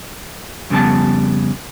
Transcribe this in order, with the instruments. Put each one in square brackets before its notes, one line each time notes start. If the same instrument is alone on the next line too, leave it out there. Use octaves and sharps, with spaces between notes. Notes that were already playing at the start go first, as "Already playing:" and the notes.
[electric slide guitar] F2 C#3 G3 B3 A5